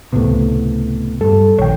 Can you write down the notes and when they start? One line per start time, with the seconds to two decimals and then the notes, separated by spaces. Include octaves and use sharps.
0.12 C#2 A2 C3 A3 B3
1.21 G2 G3 A4
1.58 A#1 D#3 C#5 G5